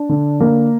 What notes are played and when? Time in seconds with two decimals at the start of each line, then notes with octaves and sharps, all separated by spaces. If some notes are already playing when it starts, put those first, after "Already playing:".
Already playing: D4
0.09 D3
0.40 A#3